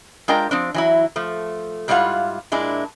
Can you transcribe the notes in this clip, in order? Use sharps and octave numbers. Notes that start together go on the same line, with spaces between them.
G#3 D4 F4 A#4 G5 A#5
F3 C4 D4
E3 F#3 E4
F3 A3
G#2 G3 E4 F4 F5 F#5
A#2 G#3 D4 E4